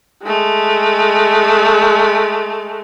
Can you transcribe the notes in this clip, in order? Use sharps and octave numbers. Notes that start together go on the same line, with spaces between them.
G#3 A3